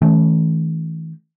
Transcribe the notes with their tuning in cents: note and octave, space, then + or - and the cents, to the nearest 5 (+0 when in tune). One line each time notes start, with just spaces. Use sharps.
E3 -40 A3 -15 C#4 +0